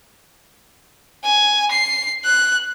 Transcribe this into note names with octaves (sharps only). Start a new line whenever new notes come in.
G#5
C7
F#6